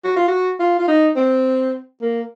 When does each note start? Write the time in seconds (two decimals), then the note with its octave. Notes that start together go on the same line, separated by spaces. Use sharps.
0.04 F#4
0.16 F4
0.28 F#4
0.60 F4
0.79 F4
0.88 D#4
1.16 C4
2.01 A#3